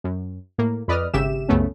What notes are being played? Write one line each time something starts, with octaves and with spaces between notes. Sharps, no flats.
F#2
A2 A#3
F2 B4 D5 D#5 D#6 F6
G#1 C#3 G4 E5 E7
C2 F#2 C#3 A3 B3 C#4